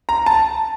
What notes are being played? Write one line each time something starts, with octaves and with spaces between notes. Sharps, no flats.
A#5
A5